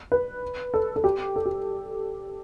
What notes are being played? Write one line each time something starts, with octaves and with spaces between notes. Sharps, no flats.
B4
A4
A4
G4
A4
G4